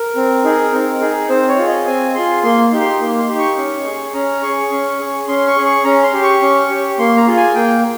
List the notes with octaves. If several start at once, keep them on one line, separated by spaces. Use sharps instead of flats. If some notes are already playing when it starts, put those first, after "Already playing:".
Already playing: A#4
C4
D#4 G#4
C4
D#4 G#4
C4 C5
C#5
F4 G#4
D#5
C4 G#5
F4 G#4 C6
A#3 C6
D#4 G4
C6
A#3
C6
D#4 G4
C#6
C#4
G#4
C#4 A#5
G#4 C#6
C#4
G#4
C#4 C6
C#6
G#4
C#6
C#4 A#5
C6
G4
C#6
C#4
G4
A#3 C6
A#5
F4 G#4
G#5
A#3 G5